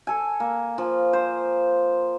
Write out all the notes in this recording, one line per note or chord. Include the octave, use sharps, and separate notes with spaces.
A4 G#5
A#3
F3
C5